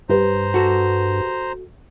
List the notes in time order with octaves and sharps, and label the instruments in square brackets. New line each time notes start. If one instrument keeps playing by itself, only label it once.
[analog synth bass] G2 [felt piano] G4 B4 [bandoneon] C5 A#5
[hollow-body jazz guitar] F#4 A4